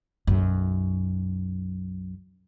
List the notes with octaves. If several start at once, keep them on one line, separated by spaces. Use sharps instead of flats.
B1 F#2